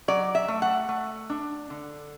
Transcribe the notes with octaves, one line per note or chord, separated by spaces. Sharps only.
F#3 D5
E5
A3
F#5
A3
D4
D3